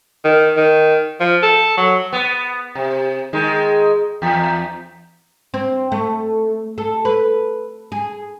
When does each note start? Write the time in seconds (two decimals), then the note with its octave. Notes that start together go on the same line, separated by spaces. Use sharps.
0.24 D#3
0.57 D#3
1.20 F3
1.42 A4
1.77 F#3
2.13 B3
2.75 C3
3.33 D#3 G#3
4.22 E2
5.54 C4
5.92 A3
6.78 A4
7.05 B4
7.92 G#4